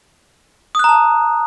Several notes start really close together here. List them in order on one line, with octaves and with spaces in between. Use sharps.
D#6 F#6 A#5 A5